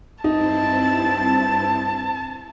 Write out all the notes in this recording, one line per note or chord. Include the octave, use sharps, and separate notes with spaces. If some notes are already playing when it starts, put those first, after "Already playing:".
G2 C4 D#4 E4 A5